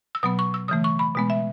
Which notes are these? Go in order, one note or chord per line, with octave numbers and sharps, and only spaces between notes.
E6
B2 F#3 B3 D#6
C#6
E6
C#3 E3 A3 D#6
C#6
B5
B2 G#3 B3
E5